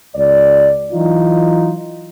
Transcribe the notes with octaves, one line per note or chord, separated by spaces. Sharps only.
C#2 D5
E3 F#3 D#4 F4